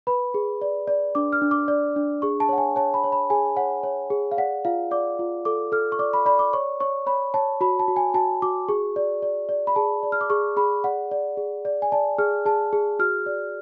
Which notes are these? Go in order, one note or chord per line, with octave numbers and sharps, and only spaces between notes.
B4 B5
G#4
D5
D5
D4 D6
F6
D4
D6
D5
D4
G#4 C#6
A5
C#5 F#5
G#5
C#5 A5
B5
C#5
B5
G#4 G#5
C#5 F#5
C#5
G#4
F5
D5 F#5
F4 F5
D5 D6
F4
A4 D6
A4 F6
C#6
D5 D6
B5
D5 B5
D6
C#5 C#6
C#5 C#6
C#5 B5
C#5 A5
F#4 B5
A5
F#4
G#5
F#4 A5
F#4 D6
G#4 C#6
D5
D5
D5
B5
G#4 A5
D5
F6
D6
G#4 C#6
G#4 B5
D5 F#5
D5
G#4
D5
G#5
D5 A5
G#4 F6
G#4 A5
G#4
F#4 F6
D5